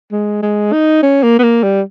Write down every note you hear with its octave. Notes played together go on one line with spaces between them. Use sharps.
G#3
G#3
D#4
C#4
A#3
B3
A#3
G3